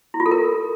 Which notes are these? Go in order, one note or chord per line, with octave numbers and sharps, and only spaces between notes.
E4
F4
A4
A#4